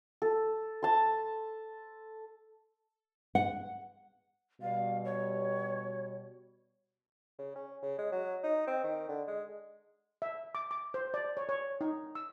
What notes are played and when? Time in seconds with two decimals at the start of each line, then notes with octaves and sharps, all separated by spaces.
0.22 A4
0.82 A5 C6
3.35 F#5
4.61 B2 G3 F5
5.05 C#5
7.39 C#3
7.55 C#4
7.82 C#3
7.98 G#3
8.12 F#3
8.44 D#4
8.67 C4
8.84 D#3
9.08 D3
9.27 G#3
10.22 E5
10.55 D6
10.71 D6
10.94 C5
11.14 D5
11.37 C#5
11.49 C#5
11.81 D#4
12.15 E6